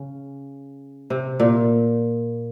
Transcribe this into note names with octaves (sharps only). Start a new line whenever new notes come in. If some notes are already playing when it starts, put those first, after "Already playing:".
Already playing: C#3
C3
A#2